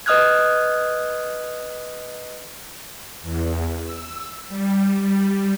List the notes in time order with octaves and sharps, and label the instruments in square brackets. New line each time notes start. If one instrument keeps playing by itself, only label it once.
[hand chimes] B4 D#5 D#6 F6 F#6 G#6
[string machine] E2
E6
G3
G3